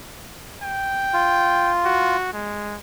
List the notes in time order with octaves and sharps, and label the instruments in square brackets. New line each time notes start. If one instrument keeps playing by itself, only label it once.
[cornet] G5
[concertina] F4
[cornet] F#4
G#3